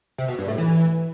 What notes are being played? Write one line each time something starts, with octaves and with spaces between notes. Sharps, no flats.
C3
B2
G2
A2
E3